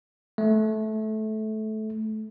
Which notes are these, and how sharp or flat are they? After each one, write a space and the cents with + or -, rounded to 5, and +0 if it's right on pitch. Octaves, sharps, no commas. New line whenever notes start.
A3 -20